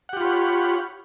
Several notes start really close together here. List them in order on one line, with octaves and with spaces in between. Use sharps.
F#5 G4 F4 B5 C#5